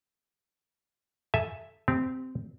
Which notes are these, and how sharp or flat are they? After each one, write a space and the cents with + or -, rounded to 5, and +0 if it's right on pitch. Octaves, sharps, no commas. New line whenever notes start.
A4 +0 E5 +0 G#5 +0
C4 -15 G4 +0